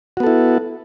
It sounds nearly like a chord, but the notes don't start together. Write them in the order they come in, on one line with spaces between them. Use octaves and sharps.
F#4 B3 A4 E4